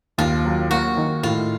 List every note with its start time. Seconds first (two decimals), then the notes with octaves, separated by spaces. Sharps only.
0.18 D#2 F4
0.45 F#3
0.71 A#3 F#4
0.97 D#3
1.23 A2 F4